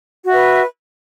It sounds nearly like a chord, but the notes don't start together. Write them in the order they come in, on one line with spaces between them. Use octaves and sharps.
F#4 E5 B4